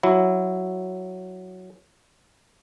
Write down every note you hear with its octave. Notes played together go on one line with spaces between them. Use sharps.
F#3 E4